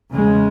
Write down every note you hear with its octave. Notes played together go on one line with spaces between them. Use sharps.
E2 C#3 G#3